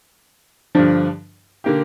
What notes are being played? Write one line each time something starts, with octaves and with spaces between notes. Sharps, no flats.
G2 D3 F3 D4
D3 A#3 G4